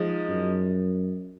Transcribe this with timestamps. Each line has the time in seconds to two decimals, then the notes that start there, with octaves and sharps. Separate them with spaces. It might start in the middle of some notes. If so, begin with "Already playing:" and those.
Already playing: F3 G#3 D#4
0.29 F#2